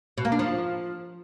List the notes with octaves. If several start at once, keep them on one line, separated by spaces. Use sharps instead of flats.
B2
A#3
D4
F3